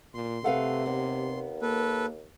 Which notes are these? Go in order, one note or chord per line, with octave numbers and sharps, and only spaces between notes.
A#2 C6
C3 A3 B4 F5 F#5
D#2 B3
A#3 A4 B4